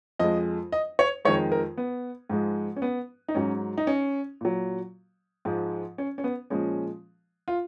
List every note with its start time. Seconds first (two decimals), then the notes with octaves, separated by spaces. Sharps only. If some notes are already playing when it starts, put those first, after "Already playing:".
0.19 F2 F3 G#3 D#5
0.72 D#5
0.99 C#5
1.25 F2 D#3 G#3 C#5
1.52 A#4
1.78 B3
2.29 G#2 F3 G#3
2.76 C#4
2.82 B3
3.29 D#4
3.35 G#2 F#3 C#4
3.78 D#4
3.87 C#4
4.41 A#2 F#3
5.45 G#2 F3 G#3
5.98 C#4
6.18 C#4
6.24 B3
6.50 A#2 F3 G#3 C#4
7.48 F4